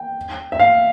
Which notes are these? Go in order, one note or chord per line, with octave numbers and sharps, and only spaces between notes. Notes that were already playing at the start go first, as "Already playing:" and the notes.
Already playing: G5
E5
F5